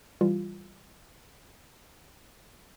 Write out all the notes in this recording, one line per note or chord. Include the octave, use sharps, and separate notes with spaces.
E3 G3 F4